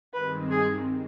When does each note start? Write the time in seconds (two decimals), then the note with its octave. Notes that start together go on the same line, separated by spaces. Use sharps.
0.13 G2 D#3 G#3 C4 B4
0.50 G#4